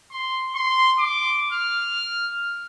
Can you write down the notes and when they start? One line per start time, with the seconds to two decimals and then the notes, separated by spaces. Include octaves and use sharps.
0.11 C6
0.56 C6
0.99 D6
1.52 F6